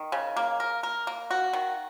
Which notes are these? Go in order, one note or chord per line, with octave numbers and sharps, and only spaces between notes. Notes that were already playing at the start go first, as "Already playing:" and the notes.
Already playing: D#3
C#3
A#3
A#4
A#4
A#3
F#4
D#3